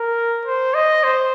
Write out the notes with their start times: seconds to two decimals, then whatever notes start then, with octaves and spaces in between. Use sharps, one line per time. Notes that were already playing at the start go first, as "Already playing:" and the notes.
Already playing: A#4
0.46 C5
0.74 D#5
1.04 C5